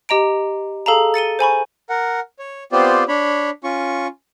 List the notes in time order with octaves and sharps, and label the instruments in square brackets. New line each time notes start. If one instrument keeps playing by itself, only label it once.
[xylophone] G4 D#5 A#5 D7
G#4 A4 F5 A5 A#5
A6 C#7 D#7 G7
C5 G#5 B5 C#6
[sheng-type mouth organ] A#4 F#5
C#5
B3 C4 F4 G4 C5 D5
D4 C#5 B5
C#4 F4 C#6